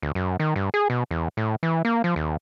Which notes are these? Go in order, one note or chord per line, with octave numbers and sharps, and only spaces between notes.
D2
F#2
D#3
G2
G#4
B2
E2
A2
E3
A#3
F3
D#2